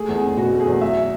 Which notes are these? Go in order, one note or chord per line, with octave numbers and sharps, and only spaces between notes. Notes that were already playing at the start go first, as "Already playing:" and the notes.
Already playing: A3 G#4
E2
G#4
F#1
B2 F#4
A3
G#4
E2
F#3 E5